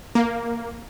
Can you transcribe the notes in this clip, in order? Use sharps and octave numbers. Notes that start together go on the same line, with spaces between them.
A#3